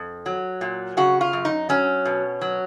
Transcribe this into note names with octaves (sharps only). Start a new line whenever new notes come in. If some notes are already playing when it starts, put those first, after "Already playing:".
Already playing: F2
F#3
A#2
C#3 F#4
F4
F#2
D#4
F#3 C#4
B2
F#3